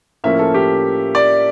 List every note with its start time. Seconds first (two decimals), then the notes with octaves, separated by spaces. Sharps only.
0.24 A2 F3 A#3 C#4 E5
0.39 A4
0.54 G4
1.15 D5